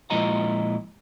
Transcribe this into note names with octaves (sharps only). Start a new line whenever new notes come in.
A#2 F3 G#3 E4 D#5 A#5